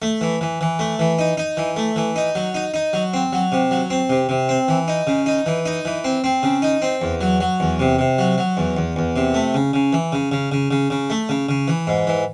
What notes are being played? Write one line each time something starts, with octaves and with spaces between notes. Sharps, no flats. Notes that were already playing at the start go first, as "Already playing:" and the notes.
A3
E3
E3
E3
A3
E3
D#4
D#4
E3
A3
E3
D#4
F#3
D#4
D#4
F#3
C4
F#3
C3
F#3
C4
C3
C3
C4
E3
D#4
C#3
D#4
E3
D#4
E3
C4
C4
C#3
D#4
C4
E2
F#3
F#3
E2
C3
C3
F#3
F#3
E2
E2
E2
C3
A3
C#3
C#3
E3
C#3
C#3
C#3
C#3
C#3
A3
C#3
C#3
E3
G#2
E3